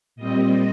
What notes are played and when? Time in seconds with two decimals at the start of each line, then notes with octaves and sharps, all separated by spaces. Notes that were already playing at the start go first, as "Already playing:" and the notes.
0.16 A#2 G3 C4 D#5